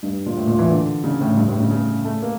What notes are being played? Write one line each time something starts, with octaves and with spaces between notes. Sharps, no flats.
G2
A#2
A2
A#2
E3
D3
C#3
A2
G2
A2
C#3
C#3
A3
A#3